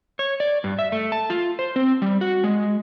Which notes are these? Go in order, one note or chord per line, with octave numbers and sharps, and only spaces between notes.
C#5
D5
G2
E5
A3
A5
F4
C5
C4
G3
F#4
G#3